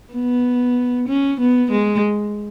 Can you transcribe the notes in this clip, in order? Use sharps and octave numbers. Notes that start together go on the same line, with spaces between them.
B3
C#4
B3
G#3